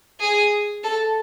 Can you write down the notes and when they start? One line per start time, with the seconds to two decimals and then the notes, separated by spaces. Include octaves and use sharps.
0.20 G#4
0.84 A4